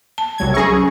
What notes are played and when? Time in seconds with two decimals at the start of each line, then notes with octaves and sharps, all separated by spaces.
0.18 A5
0.38 C2 F#3 G#6
0.54 F#3 C#4 G#4 C#6